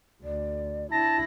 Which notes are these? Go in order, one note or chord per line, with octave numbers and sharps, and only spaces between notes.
D2 D5
D4 E4 A5 A#6